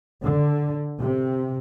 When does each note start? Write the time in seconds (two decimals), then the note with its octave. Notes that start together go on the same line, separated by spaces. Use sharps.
0.24 D3
1.00 C3